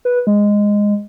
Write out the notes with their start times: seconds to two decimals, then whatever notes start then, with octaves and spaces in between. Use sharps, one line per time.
0.05 B4
0.27 G#3